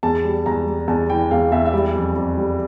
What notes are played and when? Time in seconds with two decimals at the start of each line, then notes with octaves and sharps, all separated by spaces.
0.03 E2 A5
0.25 G3
0.46 E2 A#5
0.66 G3
0.88 E2 A5
1.10 E3 G5
1.31 E2 F5
1.52 E2 E5
1.65 E5
1.73 G3 D5
1.95 F2
2.16 F2
2.37 G3